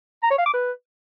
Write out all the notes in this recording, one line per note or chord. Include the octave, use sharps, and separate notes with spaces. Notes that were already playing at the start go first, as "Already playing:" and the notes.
A#5
C#5
F5
D6
B4